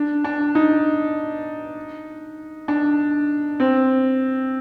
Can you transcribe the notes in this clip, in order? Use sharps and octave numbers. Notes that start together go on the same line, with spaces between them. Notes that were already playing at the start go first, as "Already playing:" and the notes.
Already playing: D4
D4
D#4
D4
C4